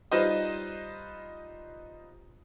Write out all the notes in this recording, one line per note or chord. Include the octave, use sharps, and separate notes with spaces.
G3 D#4 F4 B4 C5 D#5